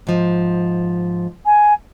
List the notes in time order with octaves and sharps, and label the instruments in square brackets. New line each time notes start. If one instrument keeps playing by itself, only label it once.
[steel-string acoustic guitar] G#2 F3
[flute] G#5